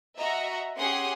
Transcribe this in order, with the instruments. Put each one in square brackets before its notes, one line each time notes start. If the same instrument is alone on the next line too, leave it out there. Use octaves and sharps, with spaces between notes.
[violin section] F#4 D#5 E5 A#5
C#4 G4 G#4 F#5 C6 D#6